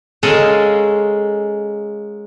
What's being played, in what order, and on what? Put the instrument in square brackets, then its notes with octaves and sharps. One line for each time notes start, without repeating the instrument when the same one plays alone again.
[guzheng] G#3 C#4 A4 A#4 D#5 F5